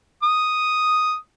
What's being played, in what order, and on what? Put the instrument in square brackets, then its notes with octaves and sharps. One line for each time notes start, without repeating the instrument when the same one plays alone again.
[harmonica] D#6